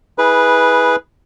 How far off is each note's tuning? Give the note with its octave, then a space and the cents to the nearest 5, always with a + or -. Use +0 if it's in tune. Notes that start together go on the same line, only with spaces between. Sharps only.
E4 -25 G#4 +0 B4 -5